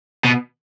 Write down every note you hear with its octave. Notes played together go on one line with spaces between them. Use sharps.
B2